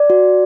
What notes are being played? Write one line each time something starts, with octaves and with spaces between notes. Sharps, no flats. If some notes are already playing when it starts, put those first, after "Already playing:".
Already playing: D5
F#4